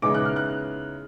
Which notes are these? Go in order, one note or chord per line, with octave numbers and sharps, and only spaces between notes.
C#3 E3 G#3 B3 D#4 D6
F#6
F6
F#6